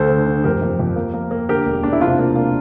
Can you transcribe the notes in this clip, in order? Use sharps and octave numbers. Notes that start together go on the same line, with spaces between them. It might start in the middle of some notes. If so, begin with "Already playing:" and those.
Already playing: D2 A4 C5
D3
D3
F2 G4 A#4
F2
F2
A#3
A#3
A#3
D3 G4 A#4
E1
E1 D4
E4
C3 D4 F4
A#3
A#3